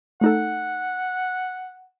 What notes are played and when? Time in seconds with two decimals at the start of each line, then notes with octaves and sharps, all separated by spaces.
0.21 A3 D#4 A4 F#5